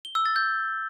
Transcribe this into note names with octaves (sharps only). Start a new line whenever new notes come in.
G7
E6
A6
G6